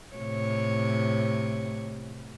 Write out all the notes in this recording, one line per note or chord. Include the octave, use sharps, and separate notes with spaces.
A2 C3 C#5